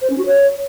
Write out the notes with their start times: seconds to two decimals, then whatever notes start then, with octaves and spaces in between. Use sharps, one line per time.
0.01 C5
0.09 C#4
0.18 F#4
0.26 C#5